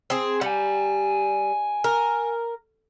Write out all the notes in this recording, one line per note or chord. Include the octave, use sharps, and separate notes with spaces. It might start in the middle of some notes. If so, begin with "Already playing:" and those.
C4 G#4
G3 F#5 G#5
A#4